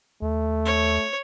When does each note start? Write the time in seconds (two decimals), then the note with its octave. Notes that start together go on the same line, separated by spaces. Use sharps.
0.22 D#2 A3
0.66 C#5